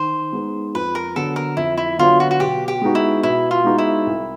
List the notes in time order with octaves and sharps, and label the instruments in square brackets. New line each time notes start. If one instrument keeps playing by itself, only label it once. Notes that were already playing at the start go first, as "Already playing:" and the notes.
Already playing: [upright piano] D#3 [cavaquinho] C5
[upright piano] G#3 B3 D#4
[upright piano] F2 [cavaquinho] B4
[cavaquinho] A#4
[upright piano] D3 F#3 B3 [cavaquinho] A4
[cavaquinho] A#4
[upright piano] F2 [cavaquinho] E4
[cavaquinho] E4
[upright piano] D3 F#3 B3 [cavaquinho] F4
[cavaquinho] F#4
F#4
[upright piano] B2 [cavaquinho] G4
[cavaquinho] G4
[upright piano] G#3 B3 D#4 F#4
[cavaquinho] E4
[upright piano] B2 [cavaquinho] E4
[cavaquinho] F4
[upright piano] G#3 B3 D#4 F#4
[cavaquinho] E4
[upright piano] C2